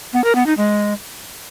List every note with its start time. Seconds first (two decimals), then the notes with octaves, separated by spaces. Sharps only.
0.13 B3
0.24 A#4
0.35 B3
0.46 D#4
0.57 G#3